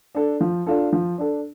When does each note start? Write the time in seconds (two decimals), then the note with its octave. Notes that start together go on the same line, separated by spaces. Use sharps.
0.15 D4 A4
0.41 F3
0.67 D4 F4 A4
0.92 F3
1.18 D4 A4